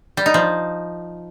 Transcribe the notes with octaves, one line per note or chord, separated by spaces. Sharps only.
G3
D#4
F3